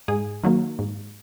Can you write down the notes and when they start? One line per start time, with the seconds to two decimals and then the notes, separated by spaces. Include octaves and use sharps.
0.08 G#2 G#4
0.44 D#3 F#3 A#3
0.79 G#2